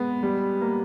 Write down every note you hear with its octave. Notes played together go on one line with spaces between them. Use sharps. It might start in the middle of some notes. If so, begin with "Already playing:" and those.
Already playing: G#3 B3
G3
A#3